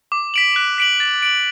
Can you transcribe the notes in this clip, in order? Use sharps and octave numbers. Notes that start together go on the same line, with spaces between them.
D6
B6 D7 F#7
F#6
B6 D7 F#7
A6
D7 F#7